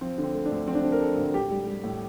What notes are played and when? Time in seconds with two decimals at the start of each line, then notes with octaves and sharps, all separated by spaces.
0.01 F3 C4
0.18 D3
0.24 C4
0.34 A3
0.45 D4
0.51 D2
0.67 F3 C4
0.75 D4
0.81 D3 C4
0.92 A#4
1.01 A3 A4
1.18 D2
1.34 A2 G4
1.51 G3
1.67 G3
1.84 A2